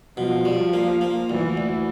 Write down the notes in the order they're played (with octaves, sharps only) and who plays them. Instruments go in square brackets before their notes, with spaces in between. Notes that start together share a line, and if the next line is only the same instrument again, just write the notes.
[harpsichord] B2 [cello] F3
[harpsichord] G3
A#3
A#3
[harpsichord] D2 [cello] E3
[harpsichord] D2